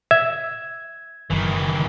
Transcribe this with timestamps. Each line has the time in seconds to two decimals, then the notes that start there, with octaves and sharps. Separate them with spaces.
0.11 E5 G#6
1.30 F#1 D#3 E3